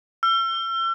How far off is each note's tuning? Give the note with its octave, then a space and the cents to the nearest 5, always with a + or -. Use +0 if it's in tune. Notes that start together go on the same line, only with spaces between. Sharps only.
E6 +40